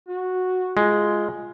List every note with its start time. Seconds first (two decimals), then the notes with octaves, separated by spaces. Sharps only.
0.08 F#4
0.77 G#3 F4